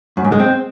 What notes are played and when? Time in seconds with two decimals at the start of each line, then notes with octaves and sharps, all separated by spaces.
0.17 F#2
0.24 G#2
0.32 G#3
0.40 C4